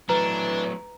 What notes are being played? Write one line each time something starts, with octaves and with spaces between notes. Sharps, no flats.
E3 F#3 A3 D4 B4 A#5